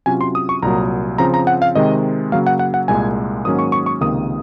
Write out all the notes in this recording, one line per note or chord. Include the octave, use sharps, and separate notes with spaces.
C3 F#3 C#4 F4 G#5
C6
D#6
C#6
C2 A#2 F#3 A#5
C#3 F3 C4 A#5
A#5
F#5
F5
C3 D#3 G#3 C4 D#5
C#3 F#3 A#3 F5
F#5
F#5
F#5
C2 A#2 G#3 G#5
G#2 D#3 F#3 A#3 C#4 D#6
C#6
C#6
C#6
C#2 C3 D#3 A#3 D#6